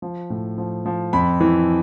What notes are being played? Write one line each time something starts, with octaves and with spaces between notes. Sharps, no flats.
F3
A2
F3
F3
F2 B5
E3